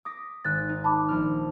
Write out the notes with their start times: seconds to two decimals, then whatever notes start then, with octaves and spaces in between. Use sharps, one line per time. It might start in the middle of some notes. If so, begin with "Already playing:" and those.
0.05 D6 D#6 A#6 B6
0.45 G#1 F#6 A6
0.69 D#4
0.84 A5 B5 D6
1.08 A#1 D4 F6